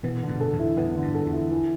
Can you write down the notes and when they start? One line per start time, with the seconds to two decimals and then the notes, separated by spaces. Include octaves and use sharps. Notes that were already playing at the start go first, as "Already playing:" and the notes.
0.03 B2 E3 B3
0.22 D3
0.28 G2 B2
0.40 A4
0.53 E2 A2
0.59 E4
0.77 E2 A2 B3
0.96 D3
1.02 G2
1.14 A4
1.26 E2
1.33 E4
1.51 E3